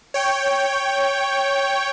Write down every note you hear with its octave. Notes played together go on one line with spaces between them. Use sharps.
C#5 G5